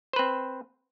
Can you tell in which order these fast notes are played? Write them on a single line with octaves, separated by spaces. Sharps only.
C5 B4 C4